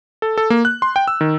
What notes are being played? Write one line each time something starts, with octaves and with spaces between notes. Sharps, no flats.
A4
A4
A#3
F#6
C6
G5
E6
D#3